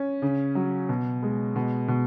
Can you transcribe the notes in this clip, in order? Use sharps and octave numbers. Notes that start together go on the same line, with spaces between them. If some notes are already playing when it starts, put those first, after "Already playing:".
Already playing: C#4
C#3
F#3
B2
G#3
B2
B2